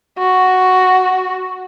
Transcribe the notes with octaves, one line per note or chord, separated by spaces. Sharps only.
F#4